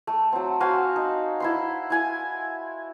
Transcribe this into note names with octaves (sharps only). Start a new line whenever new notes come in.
A3
F#3 C4
F#4 C5 F5 G#5
D#4
E4 B5 C6
E4 G#5